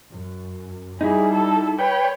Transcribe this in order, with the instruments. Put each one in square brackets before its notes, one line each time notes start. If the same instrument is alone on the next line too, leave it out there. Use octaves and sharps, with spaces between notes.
[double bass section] F#2
[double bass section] G3 [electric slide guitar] D#4 E4 [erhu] G#4
[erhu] A4
[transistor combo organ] B4 G5 [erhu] C#5